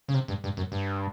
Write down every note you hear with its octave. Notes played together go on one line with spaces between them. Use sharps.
C#3
C3
G2
G2
F#2
G2